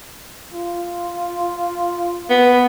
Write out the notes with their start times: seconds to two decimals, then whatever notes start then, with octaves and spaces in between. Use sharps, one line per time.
0.54 F4
2.30 B3